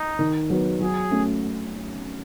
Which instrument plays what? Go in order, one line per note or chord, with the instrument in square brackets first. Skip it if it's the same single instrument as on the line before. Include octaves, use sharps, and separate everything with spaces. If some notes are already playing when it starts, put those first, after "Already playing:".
Already playing: [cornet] D#4
[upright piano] D#3
F#3 B3
[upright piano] F#3 [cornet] G#4
[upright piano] A3 C#4